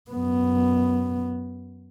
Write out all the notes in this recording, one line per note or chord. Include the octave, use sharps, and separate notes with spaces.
F#2 B3